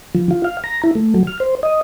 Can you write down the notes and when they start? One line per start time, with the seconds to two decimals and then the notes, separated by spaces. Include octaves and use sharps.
0.15 F3
0.31 F4
0.44 F5
0.64 A#5
0.83 E4
0.95 A3
1.14 F#3
1.27 F6
1.40 C5
1.63 D#5